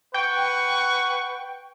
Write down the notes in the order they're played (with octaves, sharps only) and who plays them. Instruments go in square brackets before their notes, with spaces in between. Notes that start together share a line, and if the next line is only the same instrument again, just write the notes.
[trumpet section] B4 F#5 C#6 [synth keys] G5